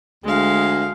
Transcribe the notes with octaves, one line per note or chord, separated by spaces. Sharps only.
D2 G#3 F5